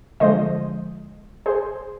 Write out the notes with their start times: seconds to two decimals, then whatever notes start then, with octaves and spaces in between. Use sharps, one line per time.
0.20 D3 F3 G#3 C5 D#5
1.46 G#4 C5